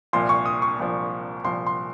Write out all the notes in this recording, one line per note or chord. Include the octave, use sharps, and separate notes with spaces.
C2 A#2 F3 C6
C#6
D#6
C#6
C2 A#2 F3
C2 A#2 F3 C6
C6